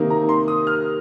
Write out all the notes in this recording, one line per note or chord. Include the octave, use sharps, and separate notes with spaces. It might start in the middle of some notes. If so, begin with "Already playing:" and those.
Already playing: C3 D#3 A#3 D#4
A#5
C6
D#6
F6